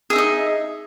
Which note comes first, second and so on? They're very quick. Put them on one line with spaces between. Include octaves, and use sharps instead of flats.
G#4 E5 D#4 D#5